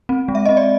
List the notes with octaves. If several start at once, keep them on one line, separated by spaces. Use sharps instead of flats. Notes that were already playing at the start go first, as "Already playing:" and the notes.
C4
G#3
E5
C4 D#5
D5